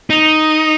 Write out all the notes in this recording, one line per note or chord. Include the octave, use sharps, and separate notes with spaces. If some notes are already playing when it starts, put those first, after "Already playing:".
D#4